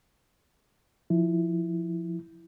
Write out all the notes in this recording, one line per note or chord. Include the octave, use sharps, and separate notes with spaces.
F3 E4